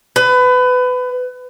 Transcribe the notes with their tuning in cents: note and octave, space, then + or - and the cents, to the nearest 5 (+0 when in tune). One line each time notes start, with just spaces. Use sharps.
B4 +25